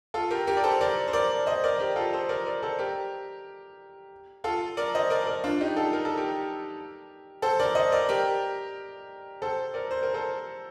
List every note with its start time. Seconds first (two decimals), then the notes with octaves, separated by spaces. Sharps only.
0.14 F4 A4
0.31 G4 A#4
0.47 G4 A#4
0.57 D5
0.64 A4 C5
0.81 A#4 D5
1.08 C5
1.13 A#4 D5
1.46 C5 D#5
1.64 A#4 D5
1.79 G4 A#4
1.96 F4 A4
2.13 A4 C5
2.29 A#4 D5
2.46 A#4 D5
2.62 A4 C5
2.78 G4 A#4
4.44 F4 A4
4.77 A#4 D5
4.94 C5 D#5
5.10 A#4 D5
5.27 A#4 D5
5.44 D4 F4
5.60 D#4 G4
5.76 F4 A4
5.93 A#4
6.05 A4
6.17 G4 A#4
7.42 A4 C5
7.59 A#4 D5
7.75 C5 D#5
7.92 A#4 D5
8.09 G4 A#4
9.42 A4 C5
9.74 A#4 D5
9.91 C5
10.03 A#4
10.14 A4 C5